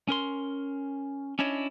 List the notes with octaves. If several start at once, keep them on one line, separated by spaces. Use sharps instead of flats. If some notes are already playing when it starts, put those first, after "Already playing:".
C#4 A#4 C6
C#4 D4 E4 C#5 D#5